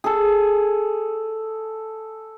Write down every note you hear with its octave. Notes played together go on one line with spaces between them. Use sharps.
G#4 A4